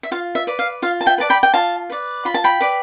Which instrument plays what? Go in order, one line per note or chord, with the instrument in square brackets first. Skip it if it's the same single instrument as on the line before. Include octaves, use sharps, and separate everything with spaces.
[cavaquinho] E5
F4 F5
E5
B4 D5
F5
F4 F5
A5
E5 G5
B4 D5 A5
G5 B5
G5
F4 F5 A5
B4 D5
F4 B5
A5
G5 B5
B4 D5